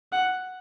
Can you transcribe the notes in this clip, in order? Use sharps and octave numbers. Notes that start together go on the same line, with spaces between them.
F#5